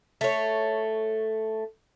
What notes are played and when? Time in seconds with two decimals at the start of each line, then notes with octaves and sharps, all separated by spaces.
0.21 A3 C#5